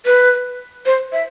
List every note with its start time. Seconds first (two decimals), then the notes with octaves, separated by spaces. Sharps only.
0.06 B4
0.86 C5
1.12 E5